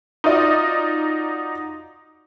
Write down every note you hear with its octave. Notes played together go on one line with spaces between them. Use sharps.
D#4 F4 F#4 D5 D#5